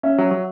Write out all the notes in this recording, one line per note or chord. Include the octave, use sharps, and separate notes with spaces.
C#4 E5
F#3
F#3